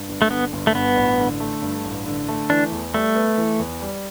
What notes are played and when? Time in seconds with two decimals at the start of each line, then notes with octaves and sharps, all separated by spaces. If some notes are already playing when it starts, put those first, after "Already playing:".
Already playing: G2
0.09 G1
0.22 A3
0.31 D3 B3
0.53 G1
0.67 A3
0.75 G2 B3
0.97 A1
1.19 D3
1.40 A3
1.62 G2
1.85 A1
2.06 D3
2.29 A3
2.50 E3 D4
2.72 E2
2.94 G3 A3
3.15 B3
3.38 E3
3.59 E2
3.82 G3